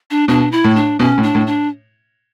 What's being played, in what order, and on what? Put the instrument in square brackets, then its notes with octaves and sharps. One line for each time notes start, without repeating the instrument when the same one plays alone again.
[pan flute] D4
[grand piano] B2 [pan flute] D4
[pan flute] E4
[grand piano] A2
[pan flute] D4
[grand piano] B2 [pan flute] C#4
[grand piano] A2
[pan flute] D4
[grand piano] A2
[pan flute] D4